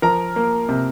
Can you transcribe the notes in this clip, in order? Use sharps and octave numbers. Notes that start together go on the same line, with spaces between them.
F3 A#4 A#5
A#3
C3